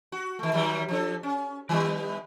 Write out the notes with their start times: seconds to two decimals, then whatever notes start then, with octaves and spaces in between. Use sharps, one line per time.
0.12 F#4
0.39 D#3 A3
0.53 D#3 F#3 G3
0.88 F3 D4 A4
1.23 C#4
1.69 D#3 G3 B3